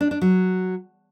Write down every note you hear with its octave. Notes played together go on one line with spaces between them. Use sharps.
D4
D4
F#3